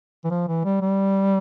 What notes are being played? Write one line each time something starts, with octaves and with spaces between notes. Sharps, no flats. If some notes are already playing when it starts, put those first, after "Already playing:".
E3
F3
E3
G3
G3